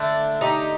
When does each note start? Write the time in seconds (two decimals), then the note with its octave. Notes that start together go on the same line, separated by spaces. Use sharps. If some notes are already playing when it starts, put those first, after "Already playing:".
Already playing: D3 A3 D4
0.41 D#4 G4